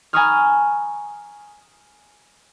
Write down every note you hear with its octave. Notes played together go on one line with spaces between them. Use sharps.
G#5 A#5 B5 C#6 D#6 F6